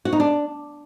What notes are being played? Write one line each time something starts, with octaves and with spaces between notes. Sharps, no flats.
F#4
D#4
D4